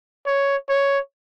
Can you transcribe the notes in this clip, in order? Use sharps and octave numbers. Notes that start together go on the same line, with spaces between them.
C#5
C#5